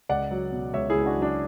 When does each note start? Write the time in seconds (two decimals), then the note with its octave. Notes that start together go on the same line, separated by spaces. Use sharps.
0.09 C#2 D5 F#5
0.31 F#3
0.52 B2
0.73 C#2 C#5 E5
0.90 E4 G#4
0.95 C#2
1.06 D4 F#4
1.17 F#3
1.22 D4